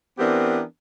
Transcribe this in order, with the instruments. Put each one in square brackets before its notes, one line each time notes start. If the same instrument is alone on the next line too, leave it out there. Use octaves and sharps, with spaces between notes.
[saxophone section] E3 B3 C4 D4 G4 A#4